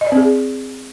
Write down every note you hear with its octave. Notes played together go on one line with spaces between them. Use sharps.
D#5
D5
C4
G#4